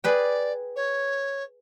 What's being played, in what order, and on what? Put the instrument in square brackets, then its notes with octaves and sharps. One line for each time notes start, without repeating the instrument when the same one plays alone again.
[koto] G#4 B4 G5 [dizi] D5
[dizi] C#5